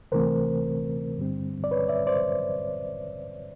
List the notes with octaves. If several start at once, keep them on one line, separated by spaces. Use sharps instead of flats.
D2 C3 E3 A3 C4 A#4 C5
G2 D3 G3 C4
D5
B4 C#5
D5 E5
C5 D5